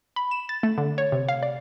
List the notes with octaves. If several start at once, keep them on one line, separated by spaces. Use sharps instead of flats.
B5
E7
A6
A3
D3
C#5
C3
F5
D5